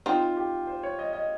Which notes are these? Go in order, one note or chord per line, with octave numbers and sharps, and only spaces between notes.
C4 D#4 F4
G4
C5
C#5
D#5
D#5